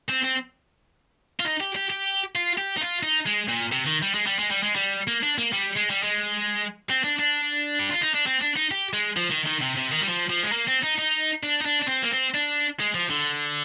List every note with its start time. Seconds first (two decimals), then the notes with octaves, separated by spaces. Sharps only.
0.08 C4
0.23 C4
1.40 F4
1.45 D#4
1.60 G4
1.75 G4
1.90 G4
2.36 F4
2.58 G4
2.76 D#4
2.81 F4
3.03 D#4
3.26 G#3
3.49 A#2
3.72 C3
3.86 D#3
4.02 G3
4.14 G#3
4.26 G3
4.39 G#3
4.51 G3
4.63 G#3
4.75 G3
5.08 A#3
5.23 D4
5.38 A#3
5.53 G3
5.76 G#3
5.90 G3
6.03 G#3
6.90 C4
7.04 D4
7.19 D4
7.79 G4
7.90 F4
8.02 D#4
8.14 D4
8.26 C4
8.41 D4
8.56 D#4
8.71 G4
8.93 G#3
9.17 F3
9.31 D#3
9.46 D#3
9.62 C3
9.76 C3
9.92 D#3
10.01 G3
10.08 F3
10.30 F3
10.43 G#3
10.52 A#3
10.67 C4
10.83 D#4
10.98 D#4
11.43 D4
11.62 D#4
11.66 D4
11.83 D4
11.88 C4
12.03 A#3
12.11 C4
12.34 D4
12.80 G#3
12.95 F3
13.10 D3